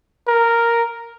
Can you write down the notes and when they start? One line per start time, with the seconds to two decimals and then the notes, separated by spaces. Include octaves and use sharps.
0.28 A#4